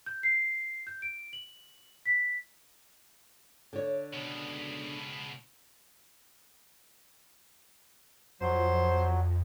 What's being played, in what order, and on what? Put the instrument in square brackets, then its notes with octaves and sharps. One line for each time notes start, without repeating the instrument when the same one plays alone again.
[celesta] G6
C7
G6
D7
F#7
B6
[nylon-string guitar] D3 C#5
[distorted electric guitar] C#2 B2
[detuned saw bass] F2 [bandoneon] F#3 [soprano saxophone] C5